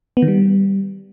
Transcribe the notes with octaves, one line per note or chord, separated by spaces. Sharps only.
B3
D#3
G3